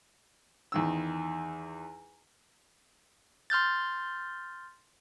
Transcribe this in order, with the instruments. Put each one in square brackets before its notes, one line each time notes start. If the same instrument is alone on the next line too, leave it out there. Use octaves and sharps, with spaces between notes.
[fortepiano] E2 D#3 E6
[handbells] C6 F6 G6 A6